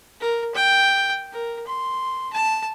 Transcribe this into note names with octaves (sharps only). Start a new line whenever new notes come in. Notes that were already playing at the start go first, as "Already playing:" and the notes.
A#4
G5
A#4
C6
A5